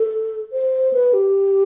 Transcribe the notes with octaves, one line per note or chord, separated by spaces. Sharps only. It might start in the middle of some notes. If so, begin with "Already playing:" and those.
Already playing: A4
C5
B4
G4